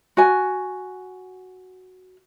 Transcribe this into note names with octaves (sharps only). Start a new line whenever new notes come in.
F#4 G#5